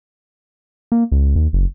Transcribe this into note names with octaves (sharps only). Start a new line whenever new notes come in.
A#3
C#2
D#2
F#1